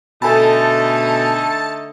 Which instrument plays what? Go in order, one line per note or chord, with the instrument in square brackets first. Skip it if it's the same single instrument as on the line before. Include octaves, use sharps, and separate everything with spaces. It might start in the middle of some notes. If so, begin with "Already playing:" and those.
[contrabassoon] B2 [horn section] D3 A3 D#4 [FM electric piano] A4 G#5 B5 [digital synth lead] A5